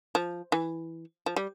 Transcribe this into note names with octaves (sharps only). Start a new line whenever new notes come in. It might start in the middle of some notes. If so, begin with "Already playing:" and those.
F3
E3
F3
G3